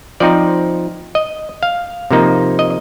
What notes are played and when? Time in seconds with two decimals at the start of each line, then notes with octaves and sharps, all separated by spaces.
0.20 F3 C4 D#4 D5
1.15 D#5
1.63 F5
2.11 C3 F3 A#3 D#4
2.59 D#5